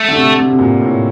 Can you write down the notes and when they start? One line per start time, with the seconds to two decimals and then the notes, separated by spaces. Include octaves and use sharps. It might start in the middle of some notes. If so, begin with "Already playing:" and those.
Already playing: A3
0.08 D3
0.15 C3
0.37 C3
0.49 C3
0.59 A#2
0.80 A2